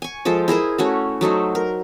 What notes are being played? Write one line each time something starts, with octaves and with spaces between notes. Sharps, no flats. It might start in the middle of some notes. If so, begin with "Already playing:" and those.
G#5 C#6
F3 G#3 A4 C5
E4 G#4 A#4 C5
A3 C#4 F#4
F#3 A3 D#4 C5
A#4